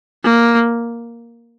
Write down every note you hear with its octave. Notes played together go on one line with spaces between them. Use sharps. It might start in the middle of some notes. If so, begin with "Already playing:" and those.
A#3